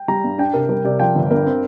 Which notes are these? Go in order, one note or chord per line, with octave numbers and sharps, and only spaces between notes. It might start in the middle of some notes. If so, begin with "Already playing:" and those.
Already playing: G5
G3 A#5
G2
D4 G5
C3 A#4
G3 A#4
C3 D5
F3 G5
G1
G2 A#4
C4